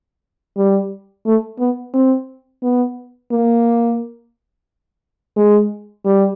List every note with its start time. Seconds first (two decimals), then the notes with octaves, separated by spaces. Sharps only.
0.57 G3
1.26 A3
1.59 B3
1.94 C4
2.63 B3
3.32 A#3
5.36 G#3
6.05 G3